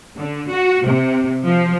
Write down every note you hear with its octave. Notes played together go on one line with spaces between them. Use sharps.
D3
F#4
C3
F3